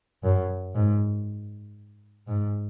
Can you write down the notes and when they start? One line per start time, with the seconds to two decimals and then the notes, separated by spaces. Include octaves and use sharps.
0.23 F#2
0.75 G#2
2.28 G#2